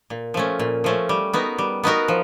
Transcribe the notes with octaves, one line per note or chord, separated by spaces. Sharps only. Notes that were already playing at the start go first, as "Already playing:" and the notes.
A#2
F3 A3 C#4
A#2
F3 A3 C#4
G3
B3 D#4 F#4 A#4
G3
B3 D#4 F#4 A#4
F3